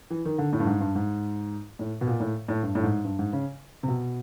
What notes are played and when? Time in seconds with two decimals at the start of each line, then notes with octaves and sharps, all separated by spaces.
0.10 E3
0.25 D#3
0.38 D3
0.53 A2
0.60 G2
0.67 G#2
0.80 G2
0.95 G#2
1.79 A2
2.01 B2
2.07 A#2
2.20 A2
2.48 A2
2.63 G2
2.75 A2
2.83 G#2
3.04 G2
3.19 G#2
3.33 C#3
3.83 C3
3.88 B2